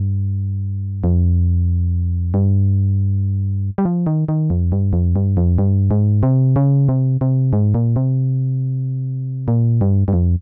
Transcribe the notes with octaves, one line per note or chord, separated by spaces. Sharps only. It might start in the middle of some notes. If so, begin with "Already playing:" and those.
Already playing: G2
F2
G2
G3
F3
D#3
D#3
F2
G2
F2
G2
F2
G2
G#2
C3
C#3
C3
C3
G#2
A#2
C3
A#2
G2
G2
F2